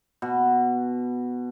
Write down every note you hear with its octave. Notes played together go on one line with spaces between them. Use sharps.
B2